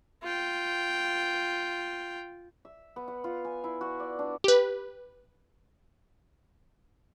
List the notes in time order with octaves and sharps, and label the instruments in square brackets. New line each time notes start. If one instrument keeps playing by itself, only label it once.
[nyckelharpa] F4 G5
[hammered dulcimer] E5
B3
F#5
F4
G#5
E4
F#4
D5
D4
[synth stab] G4 B4